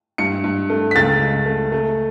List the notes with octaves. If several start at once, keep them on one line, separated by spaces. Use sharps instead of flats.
G2 C#7
G2
A3
B6
C#2 A6
C#2
A3
A3